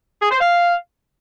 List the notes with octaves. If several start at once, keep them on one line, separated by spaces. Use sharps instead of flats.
G#4
C5
F5